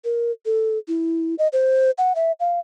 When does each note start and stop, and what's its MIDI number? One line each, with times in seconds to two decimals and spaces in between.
0.04 0.32 70
0.46 0.78 69
0.88 1.35 64
1.39 1.48 75
1.53 1.91 72
1.98 2.13 78
2.15 2.32 76
2.40 2.59 77